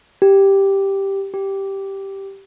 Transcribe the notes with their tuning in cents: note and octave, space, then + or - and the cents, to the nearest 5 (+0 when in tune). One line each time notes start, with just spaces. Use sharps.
G4 +0
G4 -5